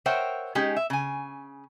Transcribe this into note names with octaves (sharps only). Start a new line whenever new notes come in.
A#4 C5 C#5 E5 F#5 G5
G#3 C#4 D#4 G4 G#4
E5
C#3 G#5